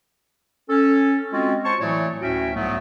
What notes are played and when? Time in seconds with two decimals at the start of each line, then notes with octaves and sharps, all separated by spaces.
0.69 C#4 A4
1.31 G#3 C4 C#4 F4 F#4
1.64 C5 C#5 A5 C#6
1.80 A2 E3 F#3 A3 C#5 D5
2.22 D2 A2 C#4 F#4 E5 G5
2.54 C2 G#2 F#3 A3 B3